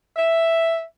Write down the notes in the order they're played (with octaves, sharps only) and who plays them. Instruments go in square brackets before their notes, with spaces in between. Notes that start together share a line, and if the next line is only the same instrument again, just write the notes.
[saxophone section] E5